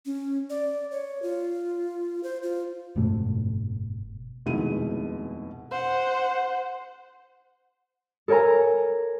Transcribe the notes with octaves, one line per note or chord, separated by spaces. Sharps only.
C#4
D5
C#5
F4
C5
F4
F#1 G#2 B2 A3
F1 D#2 B2 G#3 E4 D#7
C5 F#5
A4 A#4 C#5 G#5 A#5